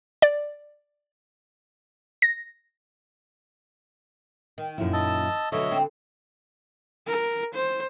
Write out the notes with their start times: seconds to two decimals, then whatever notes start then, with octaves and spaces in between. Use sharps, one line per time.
0.22 D5
2.22 A#6
4.58 D#3
4.78 F#2 A#2 E4
4.93 D#5 A5 E6
5.52 D2 B2 D3 F#3 C#5 D#5 E5
5.71 D2 C4
7.07 A#4
7.54 C5